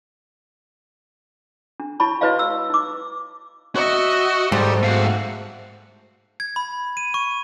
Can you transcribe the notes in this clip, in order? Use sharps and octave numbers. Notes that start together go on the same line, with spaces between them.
D4
E4 C#5 A5 B5 C#6
E4 F#4 B4 C#5 D#5 F5
E6
D#4 D6
F#4 D#5 E5
G#2 G3 A4
A3 A#3 F#4 F5
G#6
B5
D#7
C#6